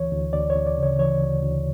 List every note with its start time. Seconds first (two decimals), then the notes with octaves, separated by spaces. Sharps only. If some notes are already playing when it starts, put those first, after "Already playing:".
Already playing: D2 E3 C#5
0.12 D2
0.33 D2 D5
0.50 C#5
0.55 D2
0.67 D5
0.78 C#3
0.83 C#5
0.99 E3 C#5
1.21 D2
1.43 D2